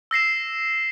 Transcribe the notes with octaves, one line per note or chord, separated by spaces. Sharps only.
E6 A#6 C7 E7